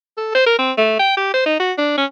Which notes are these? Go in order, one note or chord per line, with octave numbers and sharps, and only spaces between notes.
A4
C5
A#4
C4
A3
G5
G4
C5
D#4
F#4
D4
C#4